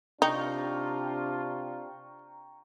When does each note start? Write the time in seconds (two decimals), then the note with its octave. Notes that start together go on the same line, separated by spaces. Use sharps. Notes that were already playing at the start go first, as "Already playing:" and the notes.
0.22 C3 D4 D#4 F4 G5 A#5 C#6